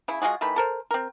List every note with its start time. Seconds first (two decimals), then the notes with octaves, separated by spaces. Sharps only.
0.08 C#3 E4
0.22 G#3 F4 F#4 G#4
0.41 D#3 E3 A3 B5
0.56 A4 A#4 C5
0.91 C4 A#4